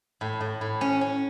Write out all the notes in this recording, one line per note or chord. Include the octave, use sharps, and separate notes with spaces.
A2
A2
A2
C#4
C#4